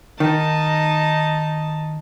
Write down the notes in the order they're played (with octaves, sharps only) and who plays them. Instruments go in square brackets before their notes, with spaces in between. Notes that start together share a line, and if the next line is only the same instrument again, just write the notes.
[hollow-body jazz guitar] D#3 [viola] D#4 A5